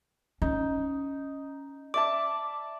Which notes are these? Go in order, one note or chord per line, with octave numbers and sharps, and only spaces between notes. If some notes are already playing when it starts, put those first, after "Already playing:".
C#4 D#4
D5 E5 A5 D6